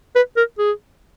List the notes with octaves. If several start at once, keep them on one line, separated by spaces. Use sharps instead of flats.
B4
A#4
G#4